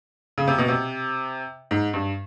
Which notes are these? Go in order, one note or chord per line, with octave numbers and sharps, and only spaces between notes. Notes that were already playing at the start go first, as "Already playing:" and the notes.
C#3
C3
B2
C3
G#2
G2